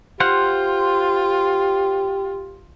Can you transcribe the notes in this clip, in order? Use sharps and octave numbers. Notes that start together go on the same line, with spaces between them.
F4 G4 C5 F5 F#5